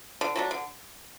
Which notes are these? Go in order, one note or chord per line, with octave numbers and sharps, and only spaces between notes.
D3
F#3 A3 D4
D3